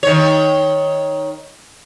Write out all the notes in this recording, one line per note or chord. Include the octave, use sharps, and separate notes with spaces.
D#3 C#5